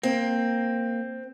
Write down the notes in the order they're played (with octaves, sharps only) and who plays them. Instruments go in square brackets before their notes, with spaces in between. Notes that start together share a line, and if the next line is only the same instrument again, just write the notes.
[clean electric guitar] A#3 [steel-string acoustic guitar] C4